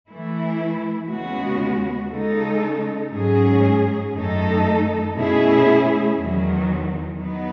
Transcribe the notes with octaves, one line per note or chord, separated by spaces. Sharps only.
E3 A3 E4
D#2 C#3 G#3 B3 F#4
C#3 G#3 D#4 A4
G#2 F#3 C#4 G#4
F#2 D#3 A3 D#4 A4
B2 A3 C#4 E4 G#4
E2 D#3 F#3
F#3 B3 D#4